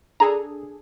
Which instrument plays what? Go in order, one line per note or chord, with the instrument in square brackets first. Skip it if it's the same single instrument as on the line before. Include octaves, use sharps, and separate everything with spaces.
[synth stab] D4 G#4 A4 [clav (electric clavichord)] A#5